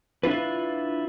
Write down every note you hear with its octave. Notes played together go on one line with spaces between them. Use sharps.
D4 E4 F4 B4